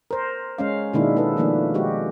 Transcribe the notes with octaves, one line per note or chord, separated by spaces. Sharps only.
A#4 C5
G#3 C#4 F5
B2 D#3 G#3 A#3 D4 E4
B3 E4 A4 B4
D#3 F3 A3 A#3 D4
G#3 F#4 G4